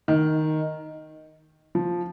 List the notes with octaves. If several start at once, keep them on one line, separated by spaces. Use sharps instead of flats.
D#3
F3